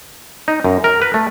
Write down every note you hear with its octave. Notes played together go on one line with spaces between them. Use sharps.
D#4
F#2
A#4
B4
A3